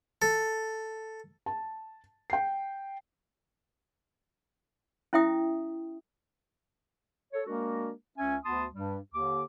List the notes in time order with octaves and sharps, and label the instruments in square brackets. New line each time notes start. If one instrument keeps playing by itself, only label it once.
[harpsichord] A4
[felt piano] A5
G5 C7
[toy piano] C#4 E4 E5 G5 D#6
[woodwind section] A4 C#5
G#3 A#3 D4 F#4 A#4
C#2 C#4 E5 G#5
D2 B3 F#4 A5 C6 D#6
G2 G3
D#2 D3 D6